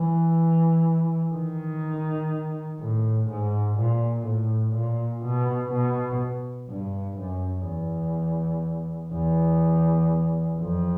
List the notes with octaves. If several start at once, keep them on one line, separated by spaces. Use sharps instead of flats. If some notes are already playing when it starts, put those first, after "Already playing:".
Already playing: E3
D#3
A2
G#2
A#2
A2
A#2
B2
B2
G2
F#2
E2
E2
F2